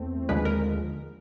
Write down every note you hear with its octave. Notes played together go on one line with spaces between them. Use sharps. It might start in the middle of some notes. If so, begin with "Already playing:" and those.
Already playing: E2 A3 C4
D#2 D3 F3 G#3 B4
A#4